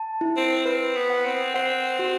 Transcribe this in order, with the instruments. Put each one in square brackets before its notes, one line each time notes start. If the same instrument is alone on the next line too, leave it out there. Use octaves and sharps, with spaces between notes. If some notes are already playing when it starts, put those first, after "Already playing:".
Already playing: [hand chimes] A5
E4
[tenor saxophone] C4
[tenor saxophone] C4 [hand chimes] B4
[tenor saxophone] B3
[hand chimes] F#5
[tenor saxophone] C4
[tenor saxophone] C4 [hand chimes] F#5
[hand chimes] F#4